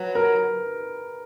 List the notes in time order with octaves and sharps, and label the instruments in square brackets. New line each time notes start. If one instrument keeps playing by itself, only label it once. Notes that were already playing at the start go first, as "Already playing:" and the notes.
Already playing: [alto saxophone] F#3 [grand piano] B4
[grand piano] A#4